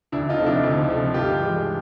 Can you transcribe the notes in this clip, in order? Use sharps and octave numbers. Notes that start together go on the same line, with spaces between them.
D2 D4 E4
D#4 F4
C3 F3 A3
D4 E4
D2
C3 F3 A3
G2 F4 G4
E3 G#3